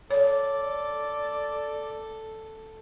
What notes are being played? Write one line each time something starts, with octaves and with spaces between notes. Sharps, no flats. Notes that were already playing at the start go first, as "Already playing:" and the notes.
A4 C#5 D5